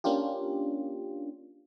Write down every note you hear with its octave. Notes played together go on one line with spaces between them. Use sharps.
A#3 C#4 D4 F4 G4